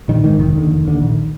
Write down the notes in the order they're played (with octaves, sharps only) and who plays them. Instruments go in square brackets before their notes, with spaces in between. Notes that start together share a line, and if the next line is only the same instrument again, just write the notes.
[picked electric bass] A#1 D#3
G#2 D#3
F1 D#3
D#2 D3
F1
D#2 D3
A#1